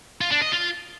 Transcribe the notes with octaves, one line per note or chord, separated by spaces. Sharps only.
F4
D4
D#5
F4